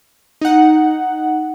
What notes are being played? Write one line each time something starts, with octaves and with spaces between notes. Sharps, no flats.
D#4 F#5